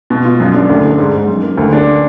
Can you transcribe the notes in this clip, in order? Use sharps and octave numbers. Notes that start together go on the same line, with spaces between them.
B2
F4
F#2
D4
D2
D4
G#2
G#2
F#2
A#3
D2
D4